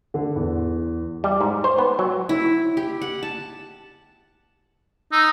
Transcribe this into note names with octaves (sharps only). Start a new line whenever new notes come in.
D3
E2
G3
G#2
C5
B3
F#3
E4
G4
F#5
A5
D#4 E6